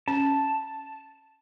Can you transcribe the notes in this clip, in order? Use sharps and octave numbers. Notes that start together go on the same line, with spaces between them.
C#4 A5